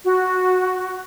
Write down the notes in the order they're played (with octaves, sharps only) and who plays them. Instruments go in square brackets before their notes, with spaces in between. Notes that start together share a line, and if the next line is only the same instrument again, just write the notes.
[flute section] F#4